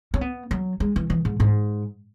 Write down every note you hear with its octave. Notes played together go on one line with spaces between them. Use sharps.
C#4
B3
F#3
G#3
E3
E3
G#2
G#2